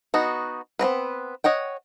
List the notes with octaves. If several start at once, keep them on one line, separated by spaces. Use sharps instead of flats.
B3 D#4 F#4
B3 C4 A#4 B4
C#5 D#5 F#5 G5